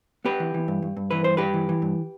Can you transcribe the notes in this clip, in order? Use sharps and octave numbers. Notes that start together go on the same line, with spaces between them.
B3 G4 B4
E3
E3
G2
G2
G2
E3 B4
G2 C5
G2 G4 B4
E3
E3
G2